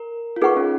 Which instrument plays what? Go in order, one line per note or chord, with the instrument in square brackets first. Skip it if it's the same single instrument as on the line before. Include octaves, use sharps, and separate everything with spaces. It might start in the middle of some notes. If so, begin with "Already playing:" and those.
Already playing: [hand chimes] A#4
F4
[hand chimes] D#4 [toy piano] G#4 B4 F#5 C#6
[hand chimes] C#4